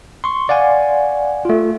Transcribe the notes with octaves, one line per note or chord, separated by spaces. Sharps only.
C6 C#6
D5 F5 F#5 G#5
A3 F4